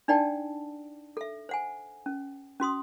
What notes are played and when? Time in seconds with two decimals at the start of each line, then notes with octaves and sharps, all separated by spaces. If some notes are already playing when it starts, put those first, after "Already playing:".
0.08 D4 D#4 D5 F#5 G5 A5
1.17 A4 E5
1.49 C5 F#5 G#5
2.06 C#4
2.60 C#4 F#4 C6 D#6